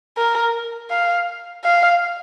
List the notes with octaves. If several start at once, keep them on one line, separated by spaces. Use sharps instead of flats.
A#4
F5
F5